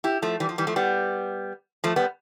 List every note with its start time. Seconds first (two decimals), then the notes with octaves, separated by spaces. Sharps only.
0.04 E4 G4
0.22 F3 A3
0.40 E3 G3
0.49 F3
0.58 E3 G3
0.67 F3 A3
0.76 G3 B3
1.84 F3 A3
1.96 G3 B3